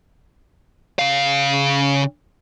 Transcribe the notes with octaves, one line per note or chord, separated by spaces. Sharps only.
C#3 F5